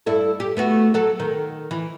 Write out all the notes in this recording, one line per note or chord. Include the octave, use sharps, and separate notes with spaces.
G2 E4 A4
G4
A3 B3 F#4
F#3 A4
D#3
E3